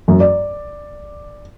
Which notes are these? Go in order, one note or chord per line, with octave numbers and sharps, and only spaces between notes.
F#2
D5